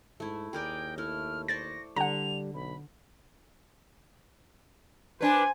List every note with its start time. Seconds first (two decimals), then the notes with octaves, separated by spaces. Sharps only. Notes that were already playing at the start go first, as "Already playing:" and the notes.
0.20 G#2 A3 E4
0.53 D#2 G#4 A#4 D5 G5
0.98 A3 E4 F6
1.48 C5 D5 C#6 A6 A#6
1.96 D3 G3 F#5 A#5 F7
2.55 B1 B5
5.21 D4 B4 C5 G#5